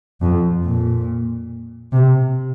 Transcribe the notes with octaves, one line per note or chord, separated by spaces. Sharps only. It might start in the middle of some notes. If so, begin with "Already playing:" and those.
F2
A#2
C3